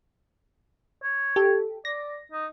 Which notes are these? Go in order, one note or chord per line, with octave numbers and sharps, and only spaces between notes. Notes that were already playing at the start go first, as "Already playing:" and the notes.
C#5
G4 A4
D5 A#6
D#4